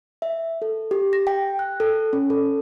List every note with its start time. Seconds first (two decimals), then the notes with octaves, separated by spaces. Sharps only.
0.22 E5
0.62 A4
0.91 G4
1.13 A#6
1.27 G5
1.59 F#6
1.80 A4
2.13 C#4
2.30 A4